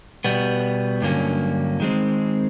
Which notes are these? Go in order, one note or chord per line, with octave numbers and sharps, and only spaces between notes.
B2 G3 B3
G2 D3 F#3 A#3 C#4
D#3 G#3 C4